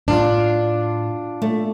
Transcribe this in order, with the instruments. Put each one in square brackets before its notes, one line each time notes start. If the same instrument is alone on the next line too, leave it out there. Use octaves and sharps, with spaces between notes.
[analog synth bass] A2 [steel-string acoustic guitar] D4 F4
[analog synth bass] A#2 [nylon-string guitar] A3